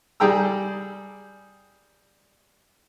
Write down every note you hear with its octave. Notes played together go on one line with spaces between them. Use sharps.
G3 G#4 G5 A#5 E6